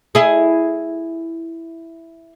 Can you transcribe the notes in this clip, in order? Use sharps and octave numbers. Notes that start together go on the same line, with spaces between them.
E4 G#4